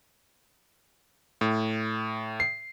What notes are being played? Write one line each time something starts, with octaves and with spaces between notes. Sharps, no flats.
A2
C7